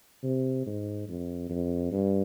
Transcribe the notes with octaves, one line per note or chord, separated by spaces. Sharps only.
C3
G#2
F2
F2
G2